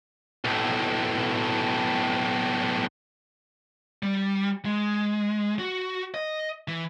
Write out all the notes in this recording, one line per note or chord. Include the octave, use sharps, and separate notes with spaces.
B1 A2
G3
G#3
F#4
D#5
E3